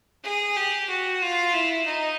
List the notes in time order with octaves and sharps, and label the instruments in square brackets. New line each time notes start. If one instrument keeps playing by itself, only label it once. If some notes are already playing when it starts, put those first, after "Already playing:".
[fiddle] G#4
G4
F#4
F4
E4
D#4